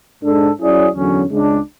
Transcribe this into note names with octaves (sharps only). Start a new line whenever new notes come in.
G#2 G#3 D4 A4
F#3 C#4 E4 G#4 D5
E2 D3 F#3 C#4
C#2 C#3 G#3 D4